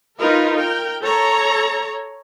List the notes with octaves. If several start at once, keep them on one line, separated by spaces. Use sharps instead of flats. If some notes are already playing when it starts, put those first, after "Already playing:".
D#4 F4 A#4 B4
A#4 G5
A4 C#5 A#5